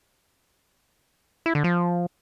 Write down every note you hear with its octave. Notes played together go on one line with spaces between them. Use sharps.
E4
D3
F3